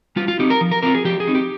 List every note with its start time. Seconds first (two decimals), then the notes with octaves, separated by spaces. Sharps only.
0.16 G3 F4
0.28 F4
0.39 C4 D#4 G4
0.50 A#4
0.61 F3
0.72 A#4
0.83 C4 F4 A#4
0.94 G#4
1.05 F3 G4
1.20 G#4
1.27 C4 D#4
1.35 G4